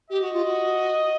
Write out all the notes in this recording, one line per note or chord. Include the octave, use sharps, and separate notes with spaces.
G4 D#5
F#4
F4
F#4